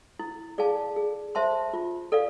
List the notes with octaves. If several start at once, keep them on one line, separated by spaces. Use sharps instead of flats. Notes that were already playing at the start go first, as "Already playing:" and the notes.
E4
G#4 D5 F5 A5
G#4
C5 E5 A5 C6
F4
A4 D5 F5